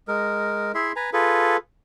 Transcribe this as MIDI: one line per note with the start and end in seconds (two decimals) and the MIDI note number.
0.08 0.72 56
0.08 0.72 70
0.75 0.92 64
0.75 0.92 68
0.75 0.92 76
0.75 0.92 84
0.96 1.10 71
0.96 1.10 80
0.96 1.10 82
1.13 1.57 65
1.13 1.57 68
1.13 1.57 69
1.13 1.57 71